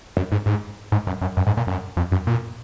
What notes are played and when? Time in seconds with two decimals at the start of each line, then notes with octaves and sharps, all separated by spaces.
0.17 F#2
0.32 G#2
0.46 G#2
0.92 G#2
1.07 F#2
1.21 F#2
1.37 F#2
1.47 G#2
1.57 A#2
1.67 F#2
1.97 F2
2.12 F#2
2.27 A#2